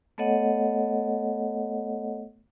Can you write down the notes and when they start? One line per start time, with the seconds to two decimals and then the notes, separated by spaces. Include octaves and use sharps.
0.18 A3 B3 A4 C#5 D#5 F#5